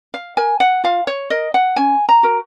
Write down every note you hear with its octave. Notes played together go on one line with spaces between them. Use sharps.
F5
A#4 G#5
F#5
F4 F5
C#5
A#4 D#5
F#5
C#4 G#5
A#5
F#4 A#4